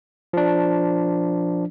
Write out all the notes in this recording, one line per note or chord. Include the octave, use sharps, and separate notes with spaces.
F3 D4